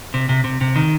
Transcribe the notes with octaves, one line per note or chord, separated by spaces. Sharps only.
C3
C3
C3
C3
D#3